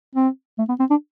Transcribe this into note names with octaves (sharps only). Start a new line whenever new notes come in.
C4
A3
B3
C4
D4